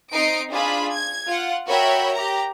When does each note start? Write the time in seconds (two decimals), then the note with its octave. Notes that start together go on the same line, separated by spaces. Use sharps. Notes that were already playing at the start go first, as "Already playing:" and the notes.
0.13 C4 D#4 C7 D7
0.52 D4 F4 G#4 B5
0.94 G#6
1.28 F4 F#5
1.68 F#4 A#4 C#5 E5 G5 B5
2.14 G4 A#5